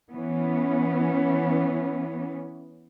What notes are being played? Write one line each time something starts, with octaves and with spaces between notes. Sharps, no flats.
E3 B3 C#4